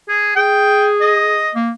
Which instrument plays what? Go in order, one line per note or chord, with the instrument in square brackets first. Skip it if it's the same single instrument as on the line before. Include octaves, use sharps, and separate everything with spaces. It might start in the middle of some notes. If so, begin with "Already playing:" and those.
[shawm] G#4
[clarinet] G#4 [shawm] G5
[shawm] D#5
[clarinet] A#3